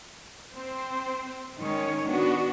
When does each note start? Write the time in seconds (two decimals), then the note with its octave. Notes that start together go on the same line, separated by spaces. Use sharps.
0.52 C4 C5
1.57 D#3 G#3 C#4 C#5
2.06 B3 D4 F#4